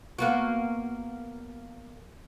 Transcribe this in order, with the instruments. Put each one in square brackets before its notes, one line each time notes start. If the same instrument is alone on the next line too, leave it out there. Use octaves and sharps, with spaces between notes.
[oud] A#3 B3 F#4